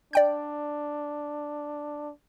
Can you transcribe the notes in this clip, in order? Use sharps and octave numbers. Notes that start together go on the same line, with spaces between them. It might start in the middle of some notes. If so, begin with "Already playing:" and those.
D4 D5 G5 G6